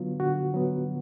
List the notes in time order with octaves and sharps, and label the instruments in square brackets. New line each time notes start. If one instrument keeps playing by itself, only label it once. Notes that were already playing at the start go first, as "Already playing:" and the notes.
Already playing: [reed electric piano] D3 F#3 B3 F4
D3 F#4
F#3 B3